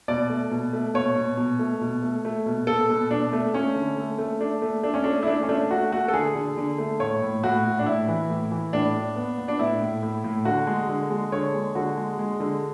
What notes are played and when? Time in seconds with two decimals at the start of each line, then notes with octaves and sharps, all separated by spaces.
0.08 B2 D5
0.30 A3
0.51 B2
0.73 A3
0.94 B2 C#5
1.16 B2
1.37 B2
1.59 A3
1.81 B2
2.02 A3
2.25 A3
2.46 B2
2.67 B2 A4
2.89 B2
3.11 B2 D4
3.33 A3
3.54 A3 C#4
3.76 D3
3.97 A3
4.18 A3
4.41 A3 D4
4.62 A3
4.83 A3 D4
4.94 C#4
5.04 A3 D4
5.23 E4
5.27 A3 D4
5.43 C#4
5.49 A3 D4
5.70 A3 F#4
5.92 A3 F#4
6.08 A4
6.13 D3 G#4
6.35 D3
6.57 D3
6.78 A3
7.00 A2 C#5
7.22 A2
7.43 A2 F#4
7.65 A2
7.79 D4
7.86 A2 E4
8.08 E3
8.30 A2
8.51 E3
8.73 A2 D4
8.95 A2
9.16 B3
9.38 B3
9.48 D4
9.59 A2 E4
9.81 A2
10.03 A2
10.24 A2
10.45 D3 F#4
10.67 G#3
10.89 D3
11.10 G#3
11.32 D3 C#5
11.54 G#3
11.75 D3 F#4
11.97 G#3
12.19 G#3
12.40 D3